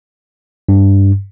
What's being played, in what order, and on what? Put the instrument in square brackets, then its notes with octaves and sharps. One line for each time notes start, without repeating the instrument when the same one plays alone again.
[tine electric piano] G2